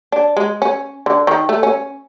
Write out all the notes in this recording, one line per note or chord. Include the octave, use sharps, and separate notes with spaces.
D4
G#3
C#4
D3
D#3
A3
C#4